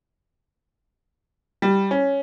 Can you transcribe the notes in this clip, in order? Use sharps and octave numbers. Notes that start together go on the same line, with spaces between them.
G3
C#4